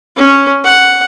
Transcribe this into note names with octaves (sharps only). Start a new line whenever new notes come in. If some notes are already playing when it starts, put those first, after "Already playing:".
C#4
F#5